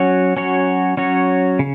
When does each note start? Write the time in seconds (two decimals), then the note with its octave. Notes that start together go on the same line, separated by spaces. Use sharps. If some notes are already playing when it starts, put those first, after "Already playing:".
Already playing: F#3 C#4 F#4 C#5
0.37 F#3 C#4 F#4 C#5
0.97 F#3 C#4 F#4 C#5
1.59 C#3